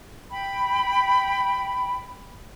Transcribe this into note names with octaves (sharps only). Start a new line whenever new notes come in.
G5 B5